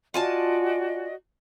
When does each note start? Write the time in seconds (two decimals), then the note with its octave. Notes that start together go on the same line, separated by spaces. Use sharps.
0.14 F4 F#4 D5 D#5 G#5 A5